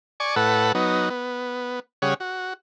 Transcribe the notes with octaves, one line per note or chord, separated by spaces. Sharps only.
D5 G#5 C#6
A2 A4 B4 F#5
F#3 B3 D#4
B3
C#3 G3 G#4 C#5 F#5
F#4